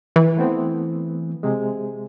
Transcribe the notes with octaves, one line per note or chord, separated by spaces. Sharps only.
E3
A3 B3 C4
C3 G#3